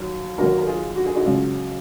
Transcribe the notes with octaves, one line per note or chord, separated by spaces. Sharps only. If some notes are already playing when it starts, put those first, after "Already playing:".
Already playing: D#2 F#3
D#2 D#3 F#3 F#4 A#4
A#4
F4 G#4
F#4
G#4
D#4 F#4
C#2 C#3 F#3 F4